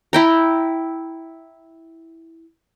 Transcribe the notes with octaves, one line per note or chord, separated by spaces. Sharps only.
E4 G5 A#5